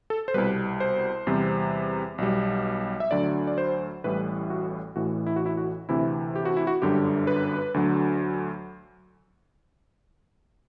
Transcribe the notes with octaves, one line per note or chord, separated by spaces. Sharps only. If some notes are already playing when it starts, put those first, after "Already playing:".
A4
C5
C2 B2 G3 B4
C5
E2 C3 G3
B1 B2 G3
E5
D2 D3 F#3 D5
D5
C5
A1 A2 E3 G3 B4
F#4
A1 A2 E3 F#4
E4
F#4
E4
F#4
D2 C3 E3 E4
G4
F#4
E4
F#4
G1 F#2 D3 G3 G4
B4
D2 D3 F#3